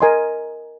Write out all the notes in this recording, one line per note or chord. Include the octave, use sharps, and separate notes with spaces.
A#4 D#5 G#5 C6